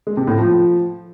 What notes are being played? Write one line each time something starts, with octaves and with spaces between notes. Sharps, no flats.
G#3
C3
A2
F3